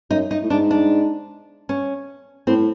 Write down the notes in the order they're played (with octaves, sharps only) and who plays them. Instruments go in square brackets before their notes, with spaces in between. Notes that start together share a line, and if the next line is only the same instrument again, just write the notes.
[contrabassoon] F#2 [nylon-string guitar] D#4
[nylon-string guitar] D#4
[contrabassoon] A2
[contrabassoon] G#2 [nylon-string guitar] D4
[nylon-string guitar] D4
C#4
[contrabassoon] A2 [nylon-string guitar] C4